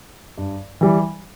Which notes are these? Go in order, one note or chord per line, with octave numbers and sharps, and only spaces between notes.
G2
E3 G3